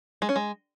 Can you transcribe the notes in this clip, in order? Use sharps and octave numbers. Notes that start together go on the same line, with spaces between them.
G#3
C#4
G#3